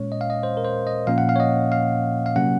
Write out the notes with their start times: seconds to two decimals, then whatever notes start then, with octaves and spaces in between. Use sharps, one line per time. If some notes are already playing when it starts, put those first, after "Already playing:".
Already playing: A#2 G#3 C#4 C#5
0.12 D#5
0.21 F5
0.30 D#5
0.43 C5
0.57 A#4
0.64 C5
0.87 D#5
1.07 A#2 F3 A#3 C#4 F5
1.18 F#5
1.29 F5
1.36 C#5
1.40 D#5
1.72 F5
2.26 F5
2.36 C3 F#3 A#3 C#4 F#5